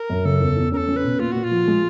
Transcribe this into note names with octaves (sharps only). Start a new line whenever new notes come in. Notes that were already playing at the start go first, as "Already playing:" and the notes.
Already playing: A#4
F#2
C#3 A4
E2
E2
C#4 A4 A#4
C#4
B4
B2
A#2 F4
A#2 F#4
F4
F3
G#3